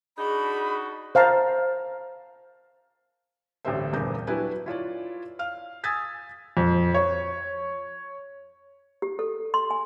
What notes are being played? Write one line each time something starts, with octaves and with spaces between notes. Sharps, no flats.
D4 D#4 F#4 G#4 B5
C5 F5 A5 A#5
A1 D2 G2 G3 C5 E5
D#1 E2 G2 A#4 G6
F#3 D4 E4 G4 B4 G#5
E4 F4 C#5 D5
F5 F6
G#5 D#6 E6 G#6 A6 B6
F2
C#5
G4
A4
C6
G#5